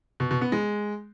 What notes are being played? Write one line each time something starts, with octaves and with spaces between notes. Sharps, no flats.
B2
B2
B3
G#3